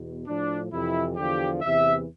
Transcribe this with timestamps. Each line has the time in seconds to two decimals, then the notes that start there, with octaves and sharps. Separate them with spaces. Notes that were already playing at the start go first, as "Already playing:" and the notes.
Already playing: E2 B2
0.27 A2 F3 D4
0.72 F2 C3 E3 E4
1.17 E2 D3 F3 G4
1.62 E2 C3 E3 E5